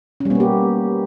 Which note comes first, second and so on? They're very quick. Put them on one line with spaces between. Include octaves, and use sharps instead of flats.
C#4 G3 B3 A#3 G4